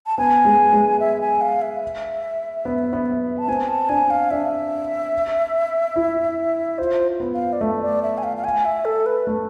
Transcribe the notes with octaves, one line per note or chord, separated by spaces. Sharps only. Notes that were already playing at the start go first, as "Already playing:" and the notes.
A5
B3 G#5
G#3
G#3
E5
G#5
F5
E5
B3
B3
A5
C4 G#5
A5
D4 G#5
F5
D4 E5
E4
F4 C5
B3
F5
D5
A3 E5
D5
E5
G#5
F5
F5
G#5
E5
A4
B4
A3